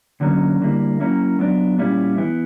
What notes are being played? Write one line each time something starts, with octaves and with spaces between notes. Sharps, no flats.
D3 F#3 A#3 C#4
D3 G3 A#3 E4
F#3 A#3 C#4 E4
F#3 B3 D4
A#2 G3 C#4 E4
E3 B3 E4